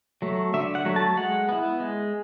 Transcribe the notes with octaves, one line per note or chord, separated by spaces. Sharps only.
F#3 A3
D3 E5
F#5
F#3 A3
A5
G#3 F#5
B3 E4
G#3